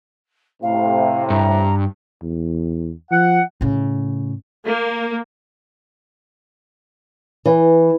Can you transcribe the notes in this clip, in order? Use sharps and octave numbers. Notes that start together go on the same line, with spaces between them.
A2 C3 F5
G2 A#5
E2
F3 F#5
A2 C#3
A#3
E3